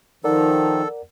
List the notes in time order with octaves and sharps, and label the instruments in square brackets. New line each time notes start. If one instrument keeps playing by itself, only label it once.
[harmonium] D#3 F3 [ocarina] D#4 [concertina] A4 [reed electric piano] A#4 D5 F#5